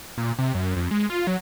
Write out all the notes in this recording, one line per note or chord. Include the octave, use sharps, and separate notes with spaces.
A#2
C3
F#2
F2
G#3
F4
F#3